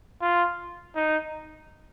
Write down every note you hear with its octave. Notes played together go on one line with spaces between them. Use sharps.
F4
D#4